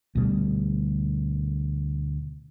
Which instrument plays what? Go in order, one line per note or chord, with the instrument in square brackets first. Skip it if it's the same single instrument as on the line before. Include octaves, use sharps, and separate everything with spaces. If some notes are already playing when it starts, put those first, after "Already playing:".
[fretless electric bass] D2 B2 G3